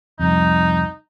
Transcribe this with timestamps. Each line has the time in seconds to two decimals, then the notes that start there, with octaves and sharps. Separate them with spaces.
0.20 C2 F2 D#4